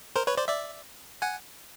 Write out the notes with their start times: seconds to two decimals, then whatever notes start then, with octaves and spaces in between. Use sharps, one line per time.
0.16 A#4 C5
0.27 B4 C#5
0.37 C5 D5
0.48 D5 E5
1.22 F#5 G#5